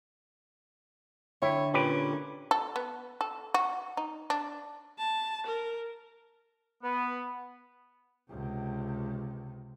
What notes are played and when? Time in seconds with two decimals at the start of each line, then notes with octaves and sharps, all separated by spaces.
1.42 D3 E4 C#5 G5
1.74 A#2 C#4 G4 B4
2.51 A4
2.76 B3
3.21 A4
3.54 F#4
3.97 D#4
4.30 D4
4.98 A5
5.46 A#4
6.83 B3
8.30 C#2 C3